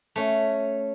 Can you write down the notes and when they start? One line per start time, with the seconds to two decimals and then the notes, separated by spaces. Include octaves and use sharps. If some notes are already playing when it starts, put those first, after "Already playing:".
0.16 A3 C#4